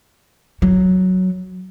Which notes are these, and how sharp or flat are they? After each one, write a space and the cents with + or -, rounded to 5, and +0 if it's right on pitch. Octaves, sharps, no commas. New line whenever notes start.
F#3 +0